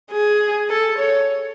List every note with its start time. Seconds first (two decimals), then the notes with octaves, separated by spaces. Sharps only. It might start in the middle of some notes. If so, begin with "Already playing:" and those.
0.11 G#4
0.69 A4
0.99 C#5